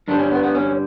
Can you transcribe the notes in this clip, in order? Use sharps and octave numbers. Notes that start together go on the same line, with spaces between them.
G2 D3 G3 D4
C#4
B3
B3
C#4